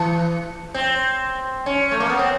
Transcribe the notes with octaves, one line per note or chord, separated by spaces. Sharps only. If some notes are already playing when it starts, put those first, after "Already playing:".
Already playing: E3
C4
C#4
A3
A#3
B3
C4